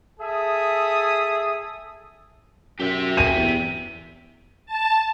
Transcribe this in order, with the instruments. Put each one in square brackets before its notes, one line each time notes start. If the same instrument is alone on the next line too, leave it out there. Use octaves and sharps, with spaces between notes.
[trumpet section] G#4 A4 E5 D#6
[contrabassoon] F#2 [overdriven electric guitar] G4 E5
[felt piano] D#7
[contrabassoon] E2
[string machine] A5